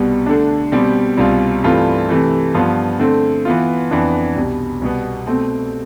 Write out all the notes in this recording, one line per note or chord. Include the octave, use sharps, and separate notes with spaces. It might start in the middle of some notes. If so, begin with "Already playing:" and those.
Already playing: C2 B2 G3 B3
D3 A3 D4
B2 G3 C4 G4
C2 B2 G3 C4 F4
G2 E3 A3 C4 F4
C3 E3 A3
G2 F3 B3 F4
D3 A3 C4
E3 B3 F4
F2 E3 B3 D4
C2 B2 G3
C2 B2 B3
B2 A3 C4